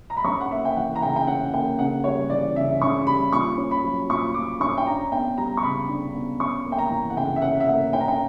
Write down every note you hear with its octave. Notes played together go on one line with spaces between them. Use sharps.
A#5
B5
C#4 C#6
F#5
A#3 E5
G5
E3 F#5
A#5
C#3 G5
G5
C#4 F#5
A#3 G5
C#3 F#5
G3 C#5
E3 D5
C#3 E5
C#3 C#6
G3 B5
A#2 C#6
C#4
B5
F#3
A#2 C#6
A#2 D6
C#4 C#6
G5
D4 A#5
B3 G5
G3 A#5
C#6
C#3 B5
D4
B3
C#4 C#6
A#3
G5
A#5
E3
F#5
C#3 G5
E5
C#4 F#5
E5
A#3 F#5
C#4 G5
A#5
G5